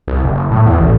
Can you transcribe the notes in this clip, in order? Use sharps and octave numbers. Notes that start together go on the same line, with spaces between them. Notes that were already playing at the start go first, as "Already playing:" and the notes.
C2
F#1
A2
E2
A1